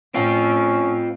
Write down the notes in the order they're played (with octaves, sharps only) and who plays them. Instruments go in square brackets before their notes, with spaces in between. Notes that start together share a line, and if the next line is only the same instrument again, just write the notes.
[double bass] A2 [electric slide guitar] C4 F4 [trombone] C#4